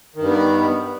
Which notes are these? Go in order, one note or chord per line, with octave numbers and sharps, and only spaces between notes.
G2 D#3 G3 B3